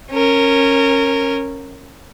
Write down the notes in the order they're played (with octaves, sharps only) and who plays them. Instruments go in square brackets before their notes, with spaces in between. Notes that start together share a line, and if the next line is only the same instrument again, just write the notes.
[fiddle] C#4 A#4